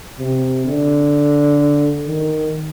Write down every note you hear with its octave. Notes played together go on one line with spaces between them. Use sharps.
C3
D3
D#3